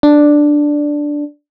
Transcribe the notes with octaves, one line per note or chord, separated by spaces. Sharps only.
D4